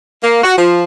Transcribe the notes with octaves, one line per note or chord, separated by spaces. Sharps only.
A#3
F#4
F3